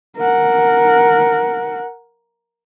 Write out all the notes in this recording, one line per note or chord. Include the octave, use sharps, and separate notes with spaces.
A#4 F#5